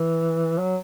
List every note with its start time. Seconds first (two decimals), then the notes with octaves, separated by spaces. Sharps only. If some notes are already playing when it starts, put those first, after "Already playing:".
Already playing: E3
0.59 F#3